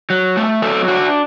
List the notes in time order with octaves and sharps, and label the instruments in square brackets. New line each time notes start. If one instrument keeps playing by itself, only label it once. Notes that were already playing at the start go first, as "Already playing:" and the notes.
[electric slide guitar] F#3
A3
F#3 A4
D4 F#4